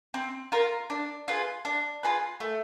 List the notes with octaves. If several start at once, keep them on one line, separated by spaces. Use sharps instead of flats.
C4
F4 A#4
D4
F4 G#4 B4
D4
F4 G#4 B4
A3